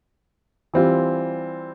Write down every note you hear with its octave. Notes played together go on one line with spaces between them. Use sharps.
E3 G3 C4 F4